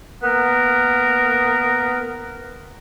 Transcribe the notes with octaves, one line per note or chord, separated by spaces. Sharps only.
A#3 B3 A#4